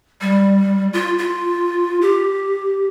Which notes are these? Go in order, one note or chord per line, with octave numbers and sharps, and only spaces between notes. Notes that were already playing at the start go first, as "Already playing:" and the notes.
G3
F4
F4
G4